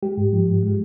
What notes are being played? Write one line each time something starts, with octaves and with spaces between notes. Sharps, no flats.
G#3 G4
G#2
F3
G#2
G#3